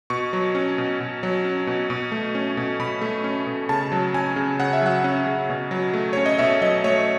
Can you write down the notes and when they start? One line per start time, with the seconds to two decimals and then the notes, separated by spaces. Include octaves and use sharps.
0.10 B2 C#6
0.33 F#3
0.55 C#4
0.78 B2
1.00 B2
1.23 F#3
1.44 C#4
1.67 B2
1.90 B2
2.12 A3
2.35 C#4
2.57 B2
2.80 B2 B5
3.01 A3
3.24 C#4
3.47 B2
3.69 C#3 A5
3.92 F#3
4.14 C#4 G#5
4.36 C#3
4.59 C#3 F#5
4.73 E5
4.82 F#3 F#5
5.04 C#4
5.27 C#3
5.49 B2
5.71 F#3
5.94 A3
6.13 C#4 C#5
6.26 D#5
6.38 B2 E5
6.62 F#3 D#5
6.84 A3 C#5